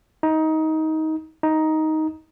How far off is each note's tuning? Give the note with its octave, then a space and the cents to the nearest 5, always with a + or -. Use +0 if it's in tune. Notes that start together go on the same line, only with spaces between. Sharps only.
D#4 +20
D#4 +10